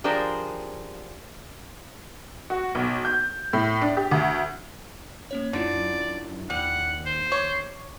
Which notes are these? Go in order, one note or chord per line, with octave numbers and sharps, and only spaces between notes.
F3 D4 G4 G#4 A#4 C5
F#4
B1
G6
A2
D4
G4
D2
A#3 C#4 C#5
F#2 D3 D4 E4 F4 D5
D#2 G3 F#5
C5
C#5 C#6 D6